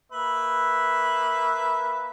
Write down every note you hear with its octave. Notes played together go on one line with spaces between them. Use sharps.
A#3 B4 E5